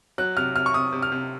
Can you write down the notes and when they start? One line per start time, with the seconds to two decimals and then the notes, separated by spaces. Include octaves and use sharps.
0.18 F#3 F#6
0.37 C3 F6
0.55 C3 F6
0.66 C#6
0.74 C3 D#6
0.93 C3
1.02 F6
1.12 C3